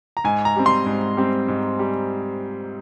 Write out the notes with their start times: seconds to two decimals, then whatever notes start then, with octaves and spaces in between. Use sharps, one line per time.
0.17 A#5
0.24 G#2 G#5
0.45 A#5
0.56 G3 C4
0.66 C6
0.86 G#2
1.17 G3 C4
1.48 G#2
1.79 G3